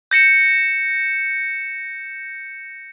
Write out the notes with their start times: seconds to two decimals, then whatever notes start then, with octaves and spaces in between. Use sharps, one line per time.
0.11 G6 A#6 C#7 E7